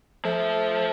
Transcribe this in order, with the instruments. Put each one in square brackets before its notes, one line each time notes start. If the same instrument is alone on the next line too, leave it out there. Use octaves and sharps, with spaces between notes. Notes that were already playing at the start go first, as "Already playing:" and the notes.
[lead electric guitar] F3 [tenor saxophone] A3